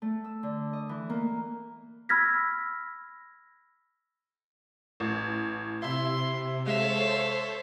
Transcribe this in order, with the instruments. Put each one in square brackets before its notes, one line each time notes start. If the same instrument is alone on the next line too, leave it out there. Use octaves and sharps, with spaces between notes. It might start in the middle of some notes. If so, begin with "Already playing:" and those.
[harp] A3
E6
D3
D#5
E3
A#3
[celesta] B5 E6 F6 G#6 A#6 B6
[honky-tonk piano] A1
[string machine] C3 [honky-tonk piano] E4 E5 [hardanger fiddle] C6
[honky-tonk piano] G#3 [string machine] A4 C5 C#5 [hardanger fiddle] E5 F5